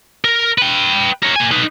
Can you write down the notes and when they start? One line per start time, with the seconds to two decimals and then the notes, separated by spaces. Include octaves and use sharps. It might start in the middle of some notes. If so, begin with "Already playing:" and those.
0.25 A#4
0.58 B4 G5
1.23 A#4 C#5
1.36 A#3 G#5
1.51 D#4 B4